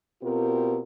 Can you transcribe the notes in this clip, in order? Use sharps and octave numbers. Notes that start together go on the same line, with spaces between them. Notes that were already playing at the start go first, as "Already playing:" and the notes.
B2 C4 F4 G4 A#4